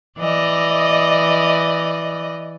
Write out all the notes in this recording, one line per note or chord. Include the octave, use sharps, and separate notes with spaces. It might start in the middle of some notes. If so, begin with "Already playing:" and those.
E3 D5 D#5